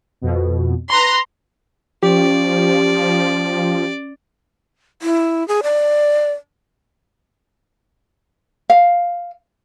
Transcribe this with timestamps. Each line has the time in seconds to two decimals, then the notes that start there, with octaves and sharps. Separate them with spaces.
0.22 F2 B2
0.89 B4 A#5 C6
2.03 F3 C#4 G4 D5
5.02 E4
5.48 G#4
5.63 D5
8.70 F5